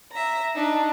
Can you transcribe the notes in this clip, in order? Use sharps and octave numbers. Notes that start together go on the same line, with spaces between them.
E5 A#5
D4 D#4